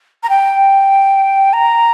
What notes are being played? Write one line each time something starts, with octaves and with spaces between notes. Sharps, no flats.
A#5
G5
A#5